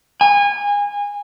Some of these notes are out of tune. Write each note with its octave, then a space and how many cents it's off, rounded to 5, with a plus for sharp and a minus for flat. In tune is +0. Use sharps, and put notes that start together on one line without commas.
G#5 -25